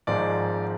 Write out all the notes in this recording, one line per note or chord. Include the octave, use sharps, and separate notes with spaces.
G#1 G#2 F3 G#3 D5